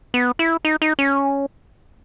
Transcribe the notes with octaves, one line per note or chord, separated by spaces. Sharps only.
B3
E4
D#4
D#4
C#4